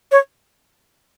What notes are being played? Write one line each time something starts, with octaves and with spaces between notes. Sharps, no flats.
C#5